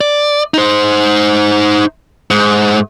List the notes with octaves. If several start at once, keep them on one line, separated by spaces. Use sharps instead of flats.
D5
D#4 C5
G#2